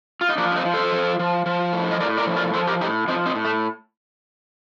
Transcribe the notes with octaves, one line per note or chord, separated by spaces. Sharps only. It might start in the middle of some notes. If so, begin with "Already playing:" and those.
F4
D#4
F3 A#3 D4
D4
C4 D#4
F3
A4 C5
F3
F3
F3
A2
D#5
A2 A#4 D5
A#4 D5
F3
A#4 D5
F3 A4 C5
G4 A#4
A2 D#4 G4
F3 C4 D#4
C4 D#4
A2
A3